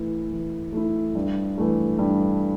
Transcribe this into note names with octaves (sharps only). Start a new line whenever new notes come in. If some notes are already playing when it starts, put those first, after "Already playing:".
Already playing: E3 A3 E4
E3
A3 E4
G2
E3 A3
G2